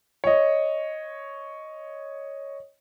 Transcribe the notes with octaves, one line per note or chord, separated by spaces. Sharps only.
C#5 D#5